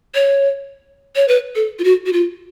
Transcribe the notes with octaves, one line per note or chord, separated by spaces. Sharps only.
C#5
C#5
B4
A4
F4
F#4
F#4
F4